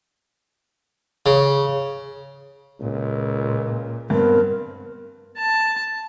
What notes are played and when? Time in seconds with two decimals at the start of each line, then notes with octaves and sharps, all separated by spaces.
1.26 C#3
2.81 C#2 A#2
4.10 G2 B3 C4 A#4
5.37 A5